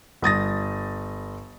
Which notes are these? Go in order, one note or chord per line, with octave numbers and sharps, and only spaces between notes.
G1 D#6 A6 A#6